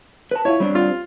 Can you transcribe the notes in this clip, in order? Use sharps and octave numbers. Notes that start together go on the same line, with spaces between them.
B4 A5
E4 F4 C#5
G3 C4 D4
F4